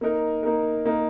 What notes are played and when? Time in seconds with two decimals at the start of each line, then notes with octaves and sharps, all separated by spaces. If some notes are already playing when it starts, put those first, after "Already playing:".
0.01 A#3 D#4 A#4
0.43 A#3 D#4 A#4
0.86 A#3 D#4 A#4